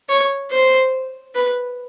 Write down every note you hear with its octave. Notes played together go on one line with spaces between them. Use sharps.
C#5
C5
B4